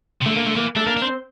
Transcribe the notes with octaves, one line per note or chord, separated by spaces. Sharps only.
C3
D3 A3
A#3
A3
E3 A#3
A3 D4 A4
A#3 D4 A#4
D4
C4 C5